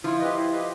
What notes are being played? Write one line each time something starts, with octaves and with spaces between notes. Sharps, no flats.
F3 E4 F4
G4 B4 D#5
E4
G4 B4 D#5